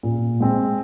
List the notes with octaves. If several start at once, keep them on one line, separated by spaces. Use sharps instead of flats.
A#2
G#3 C4